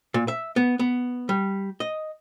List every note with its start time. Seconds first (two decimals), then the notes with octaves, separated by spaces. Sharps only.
0.14 A#2
0.28 E5
0.56 B3
0.79 B3
1.29 G3
1.80 D#5